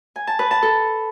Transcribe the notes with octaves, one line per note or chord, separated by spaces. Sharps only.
G#5
A5
B4
A5
A4